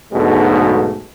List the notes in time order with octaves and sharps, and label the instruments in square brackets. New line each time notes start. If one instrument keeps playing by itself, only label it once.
[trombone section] B1 G#2 B2 D3 G#3 A3